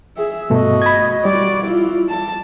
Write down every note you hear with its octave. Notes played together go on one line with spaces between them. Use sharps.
G#4 E5
G2 B2 A3 F#4 D#5
B5 G#6
G3 F#4 D5
E4 F4
A5